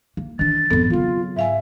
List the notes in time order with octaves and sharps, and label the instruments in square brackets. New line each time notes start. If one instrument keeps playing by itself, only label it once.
[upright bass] A#3
[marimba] D#3 [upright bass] E3 D4 [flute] A6
[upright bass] G#1 F2 [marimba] B3 C4 A4
[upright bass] C#3 F#3 [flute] F4
[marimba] G#2 F5 G#5 [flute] E5